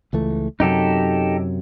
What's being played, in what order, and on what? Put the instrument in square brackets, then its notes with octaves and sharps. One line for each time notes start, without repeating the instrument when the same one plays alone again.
[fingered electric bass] C#2 E3 A3
[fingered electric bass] F#2 C3 F#3 [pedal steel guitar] D#4 G4 A4